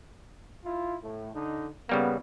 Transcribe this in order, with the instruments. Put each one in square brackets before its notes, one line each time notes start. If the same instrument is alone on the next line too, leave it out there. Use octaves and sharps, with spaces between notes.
[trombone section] E4 F4
A2
D3 D#4
[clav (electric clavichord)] C#3 G3 A#3 [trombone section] B3